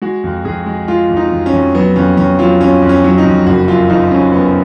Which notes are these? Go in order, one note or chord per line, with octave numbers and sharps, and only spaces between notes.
G#3 F#4
F2
F2 G#4
G#3
G#3 F4
F2
D#4
F2
C#4
F2
F#3 B3
F2 C#4
F2 C#4
F#3 F4
F2 C#4
F2
C#4
F#3 C#4
D#4
F2
F#1 F#4
F#2 F4
F3 D#4
F#2 C#4
F#2 B3